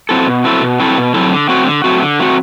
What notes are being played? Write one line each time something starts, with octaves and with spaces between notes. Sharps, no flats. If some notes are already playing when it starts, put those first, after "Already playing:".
F#3 C4 E4 A4
B2
F#3 C4 E4 A4
B2
F#3 C4 E4 A4
B2
F#3 C4 E4 A4
D3
F#3 A3 C4 F#4
D3
F#3 A3 C4 F#4
D3
F#3 A3 C4 F#4